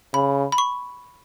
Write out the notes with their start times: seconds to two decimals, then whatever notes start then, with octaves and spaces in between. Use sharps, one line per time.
0.14 C#3 B5
0.52 B5
0.58 C#6